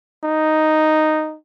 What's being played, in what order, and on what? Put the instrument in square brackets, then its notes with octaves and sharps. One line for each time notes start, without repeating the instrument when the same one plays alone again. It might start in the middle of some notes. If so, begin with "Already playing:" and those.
[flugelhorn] D#4